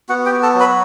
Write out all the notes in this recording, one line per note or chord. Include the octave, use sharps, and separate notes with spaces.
B3 F#4 F#5
G4 G5
F#4
A4 A5
F#3
B4 B5